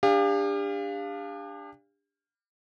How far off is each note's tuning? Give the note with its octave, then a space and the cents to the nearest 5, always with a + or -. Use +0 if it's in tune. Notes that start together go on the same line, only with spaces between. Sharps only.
D4 +0 G4 +40 F5 +0